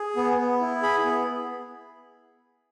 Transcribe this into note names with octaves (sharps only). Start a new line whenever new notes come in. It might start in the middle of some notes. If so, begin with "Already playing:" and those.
Already playing: G#4
B3
B3
E4
G#4 B5
B3